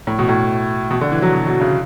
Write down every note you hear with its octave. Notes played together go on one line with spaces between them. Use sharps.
A2
B2
A2
B2
D3
E3
F#3
B2
B2
C#3